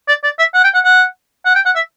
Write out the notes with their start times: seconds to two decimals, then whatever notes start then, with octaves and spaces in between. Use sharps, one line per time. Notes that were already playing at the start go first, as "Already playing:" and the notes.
0.08 D5
0.24 D5
0.39 E5
0.54 F#5
0.64 G5
0.74 F#5
0.84 F#5
1.46 F#5
1.55 G5
1.66 F#5
1.75 E5